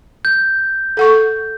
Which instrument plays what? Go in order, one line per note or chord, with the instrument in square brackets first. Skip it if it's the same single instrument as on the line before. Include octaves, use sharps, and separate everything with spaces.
[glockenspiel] G6
[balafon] A4 F#5 C#6